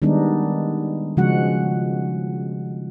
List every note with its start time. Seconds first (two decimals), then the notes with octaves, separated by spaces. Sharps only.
0.02 D#3 G3 G#3 B3 D4 D#4
1.17 C#3 F3 G#3 F#4 F#5